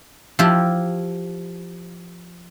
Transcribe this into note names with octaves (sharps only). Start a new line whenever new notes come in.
F3 E4 G4